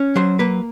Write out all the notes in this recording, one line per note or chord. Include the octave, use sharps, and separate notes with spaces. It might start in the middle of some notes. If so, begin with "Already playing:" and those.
Already playing: C#4
F#3 C5
A#3 B4